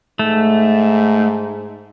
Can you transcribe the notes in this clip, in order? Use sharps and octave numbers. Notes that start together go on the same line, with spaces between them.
G#2 A3